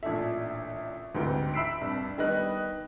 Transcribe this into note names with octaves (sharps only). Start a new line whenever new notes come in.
A1 A#2 D4 A4 E5
D2 G#2 C3 E3 G5
E5 B5 E6 B6 C7 D7
C2 G2
D#3 G3 B3 D#4 D#5 F#6